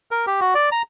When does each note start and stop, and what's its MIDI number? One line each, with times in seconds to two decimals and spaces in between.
0.11 0.26 70
0.27 0.40 67
0.41 0.54 66
0.55 0.70 74
0.72 0.82 82